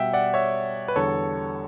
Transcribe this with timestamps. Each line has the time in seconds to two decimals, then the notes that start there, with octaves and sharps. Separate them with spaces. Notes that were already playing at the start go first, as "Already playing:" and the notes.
Already playing: B2 G3 E5 F#5 G5
0.13 D5 F#5
0.34 C#5 E5
0.88 B4
0.96 E2 D3 G3 A4 C#5